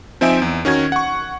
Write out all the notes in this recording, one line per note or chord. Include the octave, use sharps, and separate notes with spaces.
F3 C4 D#4 E5 G#5 D7
E2
D#3 C#4 F#4 G#6
F#5 C#6